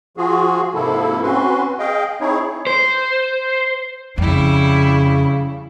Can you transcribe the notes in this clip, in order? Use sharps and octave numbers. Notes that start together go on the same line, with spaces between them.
F3 F4 F#4 G#4
G#2 C3 F3 A#3 E4 A4
C4 C#4 F#4 B4 C6
G#4 D#5 F5 G5
C4 D#4 E4 G#4 C#5
C5
F2 C#3 G3 E4